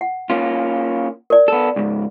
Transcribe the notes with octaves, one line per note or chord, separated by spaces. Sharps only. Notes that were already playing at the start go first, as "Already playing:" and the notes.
F#5
A#3 C#4 F4
A#4 D5
B3 A4
C#2 G#2